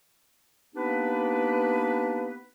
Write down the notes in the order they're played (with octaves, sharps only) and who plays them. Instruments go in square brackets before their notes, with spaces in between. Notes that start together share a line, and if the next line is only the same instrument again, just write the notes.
[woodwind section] A#3 B3 D4 D#4 G4 B4